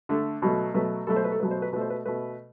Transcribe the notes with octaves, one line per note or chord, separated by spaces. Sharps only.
D3 A3
B2 F#3 A3
B2 F#3 A3 B4
B2 F#3 A3 A4
C5
B4
A4
B2 F#3 A3 B4
C5
B4
B2 A3 B4 C5
B4
B2 A3 B4